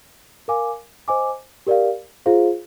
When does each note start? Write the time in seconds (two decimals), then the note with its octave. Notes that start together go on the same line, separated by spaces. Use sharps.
0.48 A#4 F5 G#5 D6
1.08 C5 D#5 G#5 D6
1.67 G4 A#4 D5 F5
2.26 F4 G#4 C5 F5